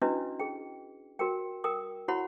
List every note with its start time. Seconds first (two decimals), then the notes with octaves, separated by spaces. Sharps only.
0.02 C#4 D4 E4 F#4 B4 D#5
0.39 G#4 G5
1.19 F#4 A#4 G5
1.64 A#4 G5 D#6
2.08 E4 F#4 C#5 F#5 B5